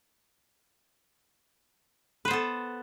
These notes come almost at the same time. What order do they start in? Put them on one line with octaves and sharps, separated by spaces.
B4 C5 B3 A4